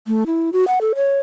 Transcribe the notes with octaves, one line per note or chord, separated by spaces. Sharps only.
A3
E4
F#4
F#5
A4
C#5